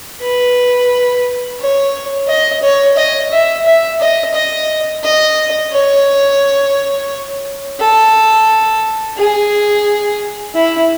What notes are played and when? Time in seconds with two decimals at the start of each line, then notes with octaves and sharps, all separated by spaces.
0.21 B4
1.60 C#5
2.28 D#5
2.63 C#5
2.97 D#5
3.32 E5
3.65 E5
4.00 D#5
4.34 D#5
5.04 D#5
5.73 C#5
7.80 A4
9.18 G#4
10.55 E4